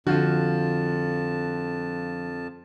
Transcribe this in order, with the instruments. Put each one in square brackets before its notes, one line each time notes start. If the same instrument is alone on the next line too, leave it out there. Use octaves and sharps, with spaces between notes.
[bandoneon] F2 A5 [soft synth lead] D3 [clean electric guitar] F3 [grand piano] F4 F#4